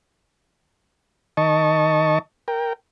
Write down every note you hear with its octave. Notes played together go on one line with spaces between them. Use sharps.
D#3 D#5 A5 C#6
A#4 G5